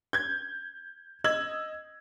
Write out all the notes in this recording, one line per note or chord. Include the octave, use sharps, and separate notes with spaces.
G6 G#6
D#5 E6 G#6 F#7